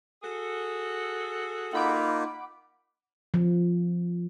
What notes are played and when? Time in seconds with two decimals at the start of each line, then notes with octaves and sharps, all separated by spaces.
0.23 F#4 G#4 A4
1.73 A#3 D#4 F4 F#5 B5 D6
3.34 F3